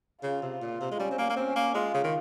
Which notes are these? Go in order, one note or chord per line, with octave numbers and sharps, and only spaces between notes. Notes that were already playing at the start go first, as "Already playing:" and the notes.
C#3 F4
C3
A#2
C3
G#3
G3 C#4
C4
A#3
A#3
C4 C#4
A#3
G#3 F4
C#3
D#3